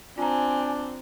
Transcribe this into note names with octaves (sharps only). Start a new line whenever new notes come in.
C4 D4 F4 G#5 A#5